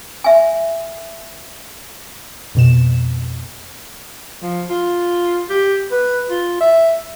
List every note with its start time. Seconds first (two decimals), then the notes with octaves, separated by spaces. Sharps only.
0.24 E5 G#5
2.55 F2 B2 E7
4.42 F3
4.70 F4
5.50 G4
5.91 B4
6.30 F4
6.61 E5